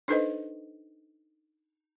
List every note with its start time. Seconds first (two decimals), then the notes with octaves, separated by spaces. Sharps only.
0.08 D4 D#4 A4 B4 C5 D#5